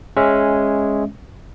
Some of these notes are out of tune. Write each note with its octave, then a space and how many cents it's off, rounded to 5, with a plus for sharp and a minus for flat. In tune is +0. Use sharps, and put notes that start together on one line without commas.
G#3 +0 C#4 -10 E5 +0